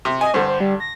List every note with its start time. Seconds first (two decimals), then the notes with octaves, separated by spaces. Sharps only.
0.05 C3
0.21 D#5 G#5
0.34 G2 D3 C5
0.48 C5
0.60 G3
0.80 A#6